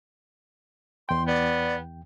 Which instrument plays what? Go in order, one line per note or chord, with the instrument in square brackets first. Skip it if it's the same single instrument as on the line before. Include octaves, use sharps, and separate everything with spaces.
[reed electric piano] E2 G5 [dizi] C6
[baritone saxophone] B3 [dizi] D5